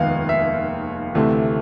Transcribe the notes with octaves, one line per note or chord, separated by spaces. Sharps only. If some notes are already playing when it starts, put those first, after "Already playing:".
Already playing: F1 D#2 D#3 G#3 B3 F5
E5
D2 C3 E3 A3